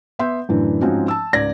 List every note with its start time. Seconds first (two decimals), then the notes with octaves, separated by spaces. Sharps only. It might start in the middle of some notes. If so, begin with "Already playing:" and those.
0.19 B3 E5 C6 G6
0.49 F#2 A2 D3 E3
0.81 G#2 F3 C4 C#4 D#4 F#4
1.08 A5 E6
1.33 C#2 G#2 D5 G#6 A#6